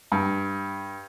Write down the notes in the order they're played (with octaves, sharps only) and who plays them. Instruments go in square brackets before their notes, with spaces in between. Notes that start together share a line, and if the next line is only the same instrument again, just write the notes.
[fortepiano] G2